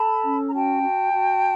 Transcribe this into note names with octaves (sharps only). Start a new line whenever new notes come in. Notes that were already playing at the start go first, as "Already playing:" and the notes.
Already playing: A4 A5 B5
C#4
A#5
F#4 G5 A5
F#4
F#4